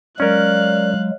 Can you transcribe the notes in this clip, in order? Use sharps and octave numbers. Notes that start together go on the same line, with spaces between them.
F#3 G#3 C#4 A#4 D5 F5 F#6